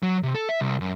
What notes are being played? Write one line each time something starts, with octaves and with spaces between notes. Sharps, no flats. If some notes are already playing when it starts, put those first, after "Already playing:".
F#3
C3
A4
E5
C2
F#2